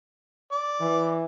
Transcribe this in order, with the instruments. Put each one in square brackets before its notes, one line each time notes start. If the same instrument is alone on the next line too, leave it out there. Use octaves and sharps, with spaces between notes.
[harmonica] D5
[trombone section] E3